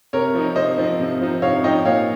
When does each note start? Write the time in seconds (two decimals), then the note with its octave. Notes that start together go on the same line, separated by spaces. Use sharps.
0.13 C3 A#4 C#5
0.34 F3 C4 D#4
0.56 C3 C5 D#5
0.77 F3 C4 D#4
1.00 C3
1.21 F3 C4 D#4
1.42 C3 C#5 F5
1.64 F3 C4 D#4 D#5 G5
1.85 A#2 C#5 F5